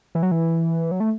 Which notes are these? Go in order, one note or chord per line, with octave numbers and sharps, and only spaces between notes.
E3
F#3
E3
F#3
A3